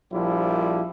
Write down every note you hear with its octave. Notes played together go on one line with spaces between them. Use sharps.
A#1 F3 G3 E4